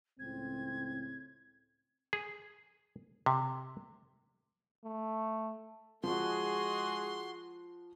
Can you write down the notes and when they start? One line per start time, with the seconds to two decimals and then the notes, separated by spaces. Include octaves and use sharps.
0.19 C#2 A2 C4 G#6
2.13 G#4
3.26 C3
4.84 A3
6.04 F3 G#3 F#4 G#4 C6